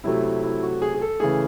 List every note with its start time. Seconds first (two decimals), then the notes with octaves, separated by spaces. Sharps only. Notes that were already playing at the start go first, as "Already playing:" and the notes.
0.04 C3 F#3 A3 E4
0.24 E4
0.44 E4
0.63 F#4
0.82 G#4
0.94 G#4
1.01 A4
1.20 C#3 E3 A3 G#4